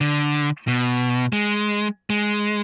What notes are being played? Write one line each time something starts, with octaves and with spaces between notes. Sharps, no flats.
D3
B2
G#3
G#3